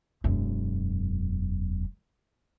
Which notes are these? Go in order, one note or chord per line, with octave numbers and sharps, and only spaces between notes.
E1 F#2